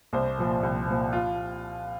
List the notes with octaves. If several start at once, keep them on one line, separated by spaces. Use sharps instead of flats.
C2 C5
A#2 F3
C2
A#2 F3
F4